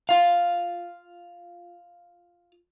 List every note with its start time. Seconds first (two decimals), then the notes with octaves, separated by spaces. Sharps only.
0.09 F4 F5